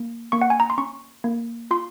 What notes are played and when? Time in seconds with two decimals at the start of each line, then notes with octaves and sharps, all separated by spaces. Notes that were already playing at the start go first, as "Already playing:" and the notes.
Already playing: A#3
0.32 A#3 C#6
0.42 F#5
0.50 G#5
0.60 A#5
0.70 C6
0.78 C#4 C#6
1.24 A#3
1.71 F4 C6